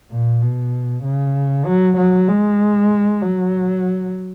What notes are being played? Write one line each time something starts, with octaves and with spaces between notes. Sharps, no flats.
A#2
B2
C#3
F#3
F#3
G#3
F#3